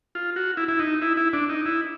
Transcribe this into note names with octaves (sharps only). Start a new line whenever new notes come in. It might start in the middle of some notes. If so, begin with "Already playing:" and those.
F4
F#4
E4
E4
D#4
E4
E4
D4
D#4
E4